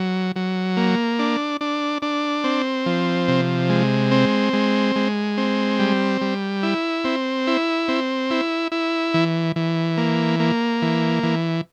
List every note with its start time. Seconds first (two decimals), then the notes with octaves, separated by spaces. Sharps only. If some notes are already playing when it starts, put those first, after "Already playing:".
Already playing: F#3
0.36 F#3
0.77 A#3
1.19 D4
1.61 D4
2.02 D4
2.44 C4
2.86 F3
3.28 C3
3.69 G#3
4.11 C4
4.53 G#3
4.96 G#3
5.37 C4
5.79 G3
6.21 G3
6.63 E4
7.04 C4
7.47 E4
7.88 C4
8.30 E4
8.72 E4
9.14 E3
9.56 E3
9.97 A#3
10.40 A#3
10.82 E3
11.23 E3